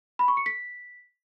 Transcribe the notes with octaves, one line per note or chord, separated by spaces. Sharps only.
B5
C#6
C#7
B6